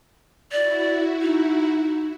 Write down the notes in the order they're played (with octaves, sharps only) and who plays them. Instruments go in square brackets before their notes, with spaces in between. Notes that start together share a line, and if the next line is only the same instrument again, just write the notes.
[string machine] E4 F#4 [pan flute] D5
[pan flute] D#4